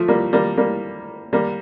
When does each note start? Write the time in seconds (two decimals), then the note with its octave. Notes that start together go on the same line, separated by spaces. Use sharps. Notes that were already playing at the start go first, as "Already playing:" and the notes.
Already playing: F3 A3
0.08 G3 A#3
0.33 G3 A#3
0.57 G3 A#3
1.33 G3 A#3